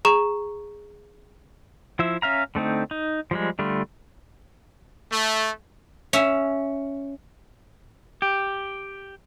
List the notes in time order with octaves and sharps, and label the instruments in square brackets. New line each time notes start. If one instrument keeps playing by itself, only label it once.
[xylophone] G#4 A#5 C#6 E7
[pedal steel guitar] F3 E4 E5
C#4 E5 F5 A#5
D3 A3 C4 D#4
D#4
F3 G3 G#3
D3 G3 A3 F4
[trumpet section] A3
[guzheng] C#4 E5
[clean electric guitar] G4